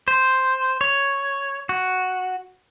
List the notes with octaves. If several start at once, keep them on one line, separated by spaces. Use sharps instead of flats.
C5
C#5
F#4